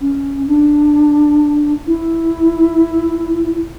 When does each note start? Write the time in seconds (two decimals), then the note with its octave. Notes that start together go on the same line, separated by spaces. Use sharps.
0.01 C#4
0.48 D4
1.87 E4